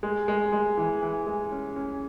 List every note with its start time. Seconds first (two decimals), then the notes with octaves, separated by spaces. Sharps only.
0.03 G#3
0.28 G#3
0.52 G#3
0.77 E3
1.02 E3
1.27 G#3
1.51 C#4
1.76 C#4